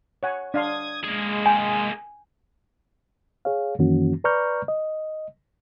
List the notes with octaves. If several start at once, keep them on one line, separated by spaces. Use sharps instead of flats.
C#5 F#5 G#5
D4 F5 C6 D#6 G#6
G#3 A#3 G#4
G5 G#5
G#4 C#5 F5
F#2 D#3 E3 A#3 C#4 F#4
B4 D5 A#5 C#6 F6 G6
D#5